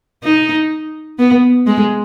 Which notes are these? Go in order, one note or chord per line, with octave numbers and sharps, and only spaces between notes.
D#4
B3
G#3